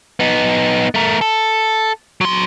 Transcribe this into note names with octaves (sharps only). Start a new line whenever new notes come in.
B3 D#4
A3 A#4
A4
F#3 C6